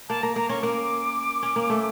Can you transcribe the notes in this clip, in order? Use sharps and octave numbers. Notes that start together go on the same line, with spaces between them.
A#3 A5
A#3 A#5
A#3 A#5
C#4 C#6
A#3 D6
C#4
A#3
A3